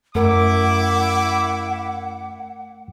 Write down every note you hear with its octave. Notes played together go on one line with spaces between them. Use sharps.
F#2 A3 E4 A#4 F#5 D6